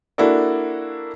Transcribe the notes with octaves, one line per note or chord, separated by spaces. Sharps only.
A#3 D4 E4 F#4 A4 D5